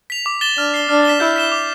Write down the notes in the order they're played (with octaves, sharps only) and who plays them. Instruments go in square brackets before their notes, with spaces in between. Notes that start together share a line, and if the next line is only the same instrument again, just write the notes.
[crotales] B6 F7
D6
A6 E7 G7
[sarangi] D4 [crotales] F6
[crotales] C7 G7
[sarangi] D4 [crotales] F6
[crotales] B6 E7 G7
[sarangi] E4 [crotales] G6
[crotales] B6 E7 G7
D6